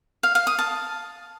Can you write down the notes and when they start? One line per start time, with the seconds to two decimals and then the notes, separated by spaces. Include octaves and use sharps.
0.23 F5
0.35 F5
0.47 D#6
0.59 A5